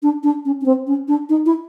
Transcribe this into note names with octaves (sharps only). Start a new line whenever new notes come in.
D4
D4
C#4
C#4
C4
C#4
D4
D#4
E4